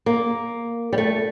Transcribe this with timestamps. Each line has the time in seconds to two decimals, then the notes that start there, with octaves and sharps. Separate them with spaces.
0.06 A#3
0.93 G3
0.98 A3